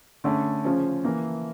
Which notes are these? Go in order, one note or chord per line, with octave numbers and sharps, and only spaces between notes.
D3 A3 C#4
C#3 F3 C#4
E3 A#3 E4